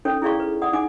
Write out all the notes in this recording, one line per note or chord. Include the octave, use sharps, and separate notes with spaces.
C#4 D#4 A4 A#4 C#5 G5
E4 G#4 D5 F5 C#6
B4
D5 F#5 D#6
D#4 F#5 G#5 D6